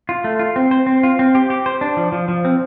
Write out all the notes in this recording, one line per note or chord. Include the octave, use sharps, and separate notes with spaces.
F4
A3
F4
C4
C5
C4
F4
C4
G4
G4
C5
D4
F3
F3
F3
C4